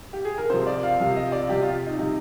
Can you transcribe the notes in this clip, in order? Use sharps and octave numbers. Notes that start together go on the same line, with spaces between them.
G4
G#4
A#4
C3 F3 C5
D5
F5
C3 F3 F5
D#5
D5
C3 F3 G4
F4
D#4
C3 F3 D#4